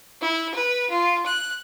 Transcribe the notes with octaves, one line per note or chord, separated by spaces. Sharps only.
E4
B4
F4
F#6